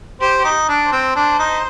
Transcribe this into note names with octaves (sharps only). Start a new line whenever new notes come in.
G4 C5
D#4
D4
C5
C4
D4 C5
D#4